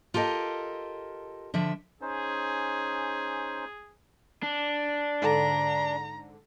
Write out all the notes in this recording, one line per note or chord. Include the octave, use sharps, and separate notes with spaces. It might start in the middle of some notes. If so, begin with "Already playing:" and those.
F4 G4 A4 A#4 D#5
D3 F3 E5
C#4 D#4 G#4 C5
D4
G#2 D3 A#5